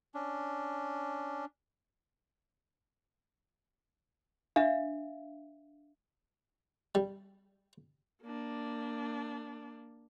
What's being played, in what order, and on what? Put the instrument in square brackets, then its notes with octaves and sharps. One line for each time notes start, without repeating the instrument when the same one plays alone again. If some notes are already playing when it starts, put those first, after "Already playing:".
[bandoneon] C#4 D4
[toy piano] D4 E5 F5
[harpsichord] G3
[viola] A#3 D4